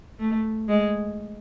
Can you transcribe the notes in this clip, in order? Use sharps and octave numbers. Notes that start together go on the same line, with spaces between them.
A3
G#3